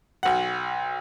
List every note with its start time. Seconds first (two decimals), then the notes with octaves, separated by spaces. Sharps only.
0.23 B1 F#5